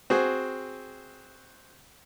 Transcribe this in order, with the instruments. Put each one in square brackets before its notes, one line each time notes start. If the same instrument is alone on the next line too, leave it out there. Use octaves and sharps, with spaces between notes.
[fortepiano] C4 F#4 G#4